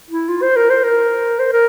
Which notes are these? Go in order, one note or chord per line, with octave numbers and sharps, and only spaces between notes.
E4
F4
C5
A#4
C5
A#4
C5
A#4